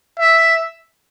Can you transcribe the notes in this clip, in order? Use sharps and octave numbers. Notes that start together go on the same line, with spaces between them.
E5